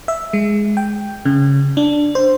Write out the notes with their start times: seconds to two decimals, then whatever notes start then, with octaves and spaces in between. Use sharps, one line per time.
0.08 E5
0.33 G#3
0.77 G5
1.25 C#3
1.77 D4
2.15 C5